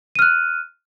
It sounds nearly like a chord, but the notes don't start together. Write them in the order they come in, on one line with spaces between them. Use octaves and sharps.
D#7 F6 F#6